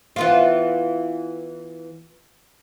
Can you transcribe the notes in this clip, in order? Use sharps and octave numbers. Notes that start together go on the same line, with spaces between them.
E3 B3 F4